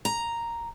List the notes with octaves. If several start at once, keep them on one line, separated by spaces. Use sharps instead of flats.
A#5